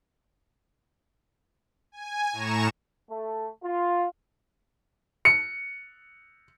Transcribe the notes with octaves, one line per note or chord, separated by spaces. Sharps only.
G#5
A2 A#5 C#6 E7
A3
F4
C#7